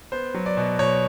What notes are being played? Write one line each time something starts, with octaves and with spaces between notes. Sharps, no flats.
B3 C5
F#3
D5
B2
B2 C#5